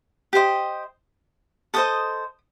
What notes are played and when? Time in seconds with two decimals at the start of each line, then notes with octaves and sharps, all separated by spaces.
0.33 G4 C5 D#5
1.74 A4 C5 D#5 D#6